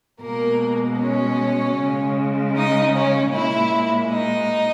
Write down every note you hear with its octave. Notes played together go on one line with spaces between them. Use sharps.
B2 G#3 A#3 A#4
C#4 C#5
C#3 G#3
D#4 D#5
C#4 C#5
A#2 G#3 E4 E5
D#4 D#5